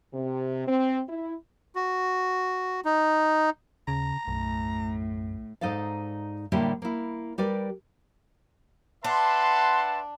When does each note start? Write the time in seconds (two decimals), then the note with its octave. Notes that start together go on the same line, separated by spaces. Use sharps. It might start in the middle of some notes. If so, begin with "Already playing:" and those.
0.14 C3
0.68 C4
1.09 E4
1.75 F#4
2.85 D#4
3.88 D#2 C#3 A#5
4.28 B1 F#2 A2
5.61 G#2 D#4 A4 D5 F5
6.52 A2 D3 G3 A#3 E4 G4
6.82 A#3 E4
7.38 G3 G4 A#4 B4 D5
9.04 D4 B4 E5 F#5 A5 C6